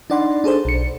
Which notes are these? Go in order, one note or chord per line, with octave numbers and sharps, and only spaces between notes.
D4 D#4 D5 F#5 B5 C6
D4 G#4 A4 C5
B1 C#7